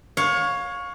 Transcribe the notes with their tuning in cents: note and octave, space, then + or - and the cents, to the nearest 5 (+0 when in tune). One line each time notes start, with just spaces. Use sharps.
C#5 +0 F5 +30